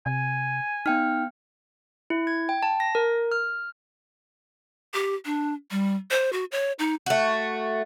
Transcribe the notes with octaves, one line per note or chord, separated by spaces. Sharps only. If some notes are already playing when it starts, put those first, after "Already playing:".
C3 G#5
B3 D#4 G5 F6
E4
G#6
G5
A5
A#6
A#4
F6
G4
D4
G3
C5
F#4
C#5
D#4
A3 F#4